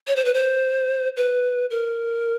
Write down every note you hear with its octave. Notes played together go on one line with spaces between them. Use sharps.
C#5
C5
B4
C5
B4
A#4